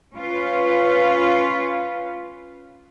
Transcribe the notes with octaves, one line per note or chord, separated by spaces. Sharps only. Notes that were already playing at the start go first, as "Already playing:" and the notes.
C#4 F4 B4